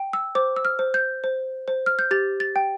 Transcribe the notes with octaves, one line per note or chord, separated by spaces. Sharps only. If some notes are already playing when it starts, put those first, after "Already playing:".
Already playing: G5
E6
C5 D6
E6
F6
C5
G6
C5
C5
F6
G6
G4 A6
A6
G5